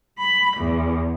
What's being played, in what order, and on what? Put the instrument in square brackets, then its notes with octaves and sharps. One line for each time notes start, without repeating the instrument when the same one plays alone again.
[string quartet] B5
E2